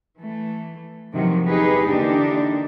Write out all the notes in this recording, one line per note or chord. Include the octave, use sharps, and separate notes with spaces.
E3 A3
G2 C3 D#3 F3 F#3
E2 D#4 G4 G#4 B4
D3 E3 A#3 D4 D#4 G4